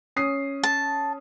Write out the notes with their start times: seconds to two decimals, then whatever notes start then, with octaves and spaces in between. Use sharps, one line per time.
0.16 C#4 D#6 C7
0.63 A5